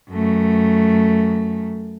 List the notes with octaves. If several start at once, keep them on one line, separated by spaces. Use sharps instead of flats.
F#2 A3